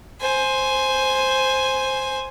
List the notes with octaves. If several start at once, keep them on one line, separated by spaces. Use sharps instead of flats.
C5 G#5